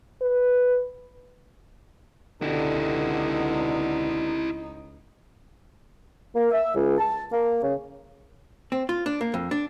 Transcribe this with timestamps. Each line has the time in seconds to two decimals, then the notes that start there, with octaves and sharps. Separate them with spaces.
0.22 B4
2.42 C#2 B2 D3 D#4 E4 G4
6.35 A#3
6.52 E5
6.75 C#2
6.98 A5
7.32 A#3
7.63 C#3
8.72 C4
8.89 F4
9.06 D4
9.21 A#3
9.34 F2
9.51 D4